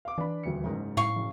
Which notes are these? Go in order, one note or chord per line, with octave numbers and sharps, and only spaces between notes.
F5 D6
E3 D4 B5
D#1 D2 C#7
F#1 G#2 A#4
A2 F5 C#6
F#1